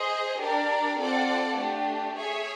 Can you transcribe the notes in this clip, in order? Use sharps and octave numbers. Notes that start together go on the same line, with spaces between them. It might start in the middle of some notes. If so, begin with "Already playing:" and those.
Already playing: G#4 C5 D#5
D4 G4 A#4 D5
C4 F4 A4 D5 F#5
A3 D4 G4
G#4 C#5 E5 G#5